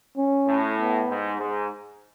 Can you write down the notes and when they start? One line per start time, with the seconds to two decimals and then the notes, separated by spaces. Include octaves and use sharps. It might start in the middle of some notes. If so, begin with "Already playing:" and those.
0.17 C#4
0.48 A2
0.78 B3
1.09 G#2
1.40 G#2